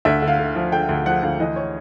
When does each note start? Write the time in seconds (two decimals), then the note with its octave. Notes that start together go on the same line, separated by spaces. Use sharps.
0.05 D2 E5
0.22 D3
0.27 F5
0.39 D3
0.55 F3
0.72 D3 G5
0.89 D2
1.06 F3 F#5
1.23 D2 F5
1.40 E3 D#5
1.56 C#5